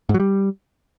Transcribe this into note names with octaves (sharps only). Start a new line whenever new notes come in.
G#2
F#3
G3